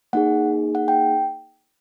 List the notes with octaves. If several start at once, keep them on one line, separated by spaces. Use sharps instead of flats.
A#3 D#4 G#4 F#5
F#5
G5